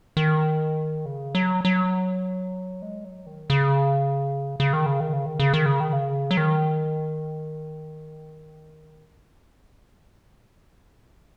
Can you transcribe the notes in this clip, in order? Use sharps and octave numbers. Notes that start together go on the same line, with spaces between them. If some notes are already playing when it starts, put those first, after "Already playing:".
D#3
C#3
F#3
F#3
G#3
F#3
D#3
C#3
C#3
D#3
C#3
D#3
C#3
D#3
C#3
D#3
C#3
D#3
C#3
F#3
D#3